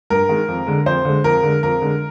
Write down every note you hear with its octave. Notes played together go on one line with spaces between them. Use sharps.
G2 A#4
D#3 G#3
F2
D3 G#3
F2 C5
D3 G#3
F2 A#4
D3 G#3
F2 A#4
D3 G#3